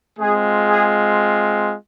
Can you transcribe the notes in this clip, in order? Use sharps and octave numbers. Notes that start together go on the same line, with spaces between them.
G#3 C4 F4 G#4
G#4